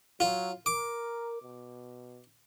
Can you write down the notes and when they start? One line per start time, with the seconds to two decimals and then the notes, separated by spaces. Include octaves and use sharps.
0.20 F#3 F4
0.66 A#4 D6
1.42 B2